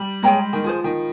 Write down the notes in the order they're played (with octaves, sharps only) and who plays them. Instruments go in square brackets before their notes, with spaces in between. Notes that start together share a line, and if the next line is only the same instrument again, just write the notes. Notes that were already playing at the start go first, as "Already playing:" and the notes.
Already playing: [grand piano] G3
[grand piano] G#3 [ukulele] G#4 C#5 G5 A#5
[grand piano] D#3
[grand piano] F3 [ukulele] F4 G#4 C5
[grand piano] D#3